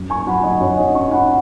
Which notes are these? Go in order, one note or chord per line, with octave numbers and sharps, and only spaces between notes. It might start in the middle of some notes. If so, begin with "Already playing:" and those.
Already playing: F#2
G#5 C#6
F#3 F#5 B5
D#5 G#5
F#2 C#5 F#5
D#5 G#5
C#4 G#5 C#6
F#5 B5